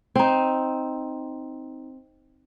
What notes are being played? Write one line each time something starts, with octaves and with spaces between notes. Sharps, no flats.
C4 D#4